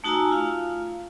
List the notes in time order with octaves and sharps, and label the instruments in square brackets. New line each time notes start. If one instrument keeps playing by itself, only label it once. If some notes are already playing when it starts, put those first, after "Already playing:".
[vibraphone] A3 D#4 F#4 G#5 A#5 E6
F4 F5